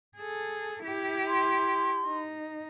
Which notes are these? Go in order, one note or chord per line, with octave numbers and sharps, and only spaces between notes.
G#4 A4
E4 G4
C6
D#4